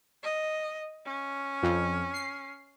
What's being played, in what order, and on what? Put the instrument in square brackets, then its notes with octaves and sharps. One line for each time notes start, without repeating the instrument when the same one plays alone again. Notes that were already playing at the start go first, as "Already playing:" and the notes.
[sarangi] D#5
C#4
[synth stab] F2
C7